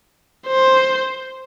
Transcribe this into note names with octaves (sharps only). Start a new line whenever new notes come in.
C5